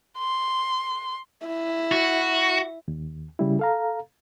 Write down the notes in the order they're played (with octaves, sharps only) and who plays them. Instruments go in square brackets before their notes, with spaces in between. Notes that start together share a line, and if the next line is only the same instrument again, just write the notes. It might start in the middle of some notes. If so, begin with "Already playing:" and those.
[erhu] C6
[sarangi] E4
[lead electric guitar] F#4
[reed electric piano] D#2
C#3 G3 E4
A4 F5 A#5